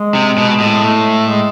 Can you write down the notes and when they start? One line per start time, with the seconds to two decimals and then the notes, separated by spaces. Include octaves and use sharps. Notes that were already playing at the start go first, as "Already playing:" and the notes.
Already playing: G#3
0.15 C3
0.38 B2
0.60 A2
0.83 A3
1.28 G#3